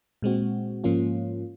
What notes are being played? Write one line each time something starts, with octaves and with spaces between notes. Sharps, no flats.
A#2 G#3 C4 F#4
G#2 F3 A#3 C#4 F4